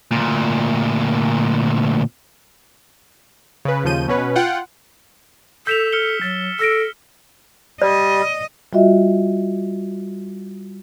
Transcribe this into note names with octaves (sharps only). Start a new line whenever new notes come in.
D2 A#2
C#3 B4
D#2 C#3 F3 G6 D#7
B2 C#4 B4
F4 F#5 G5
A4 E6 G6 B6 E7 F7
F6 C#7 G7
F#3 A6
A4 E6 A#6 D7
G3 D5 D#5
G3 F4 F#4 D#5 E5